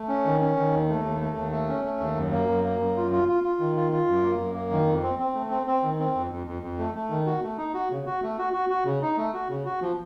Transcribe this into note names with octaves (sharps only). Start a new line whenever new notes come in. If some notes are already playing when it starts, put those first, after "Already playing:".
Already playing: A3
C#4
D#3
C#4
D#3
D#2
A3
D#2
A3
D#2
A3
C#4
A3
D#2
F#2
A#3
F#2
A#3
F#2
F4
F4
F4
F4
D#3
F4
F4
F#2
A#3
F#2
A#3
D#3
F2
C4
C4
A3
C4
C4
D#3
C4
F2
F2
F2
F2
A3
A3
D#3
F#4
A3
D#4
F#4
C#3
F#4
A3
F#4
F#4
F#4
C#3
D#4
A3
F#4
C#3
F#4
F3